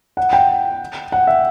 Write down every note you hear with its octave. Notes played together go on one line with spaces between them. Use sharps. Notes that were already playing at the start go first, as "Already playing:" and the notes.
F#5
G5
F#5
E5